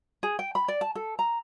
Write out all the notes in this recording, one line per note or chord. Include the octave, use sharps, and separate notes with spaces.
G#4
G5
B5
D5
A5
A4
A#5